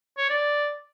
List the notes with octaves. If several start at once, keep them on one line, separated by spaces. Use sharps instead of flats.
C#5
D5